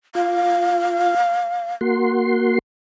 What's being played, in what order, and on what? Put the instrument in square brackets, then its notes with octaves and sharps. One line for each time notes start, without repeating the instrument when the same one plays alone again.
[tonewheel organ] F4 [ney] F5
[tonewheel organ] A#3 F#4 C6